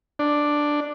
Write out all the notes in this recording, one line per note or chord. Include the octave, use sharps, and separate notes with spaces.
D4